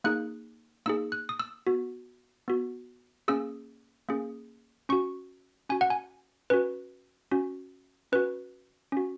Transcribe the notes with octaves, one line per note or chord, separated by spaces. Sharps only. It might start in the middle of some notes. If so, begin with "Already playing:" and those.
A#3 D#4 G#4 F#6
A#3 D#4 G#4 E6
F#6
D#6
E6
B3 F#4
B3 F#4
A#3 C#4 G#4 E6
A#3 C#4 G#4
C#4 F#4 C#6
C#4 F#4 G#5
F#5
G#5
C#4 F#4 B4
C#4 F#4
C#4 F#4 B4
C#4 F#4